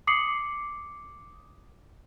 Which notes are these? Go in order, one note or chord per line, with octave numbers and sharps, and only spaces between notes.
D6 D#6 C7 C#7 F#7